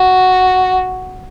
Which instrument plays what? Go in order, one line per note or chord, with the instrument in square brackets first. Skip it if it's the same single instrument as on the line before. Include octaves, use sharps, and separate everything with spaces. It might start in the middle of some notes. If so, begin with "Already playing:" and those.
Already playing: [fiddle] F#4